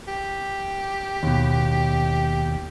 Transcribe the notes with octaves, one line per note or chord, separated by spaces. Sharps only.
G4
D#2 B2